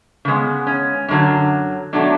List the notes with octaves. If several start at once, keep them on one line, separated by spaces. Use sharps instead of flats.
C#3 G#3 B3
C#4
F#2 D3 F#3
B2 F#3 A3 D4